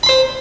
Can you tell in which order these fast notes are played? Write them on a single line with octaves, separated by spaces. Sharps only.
B5 C6 C5